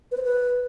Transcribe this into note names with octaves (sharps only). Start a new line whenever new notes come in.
B4
C5
B4